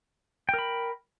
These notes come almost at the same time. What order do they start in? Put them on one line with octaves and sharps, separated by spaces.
G5 A#4 B5